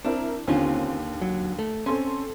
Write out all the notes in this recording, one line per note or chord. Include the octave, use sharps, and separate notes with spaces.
C4 D4 E4 A#4
D#2 D3 C4 C#4 F4
F#3
A3
C4 C#4 A4 C6